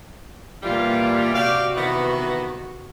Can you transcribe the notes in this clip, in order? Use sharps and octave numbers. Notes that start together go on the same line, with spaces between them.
A#2 E3 G3 F4
C3 F#4 G4 D5 F5
D#3 E3 B3